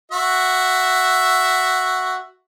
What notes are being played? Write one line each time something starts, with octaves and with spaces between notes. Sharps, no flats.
F#4 E5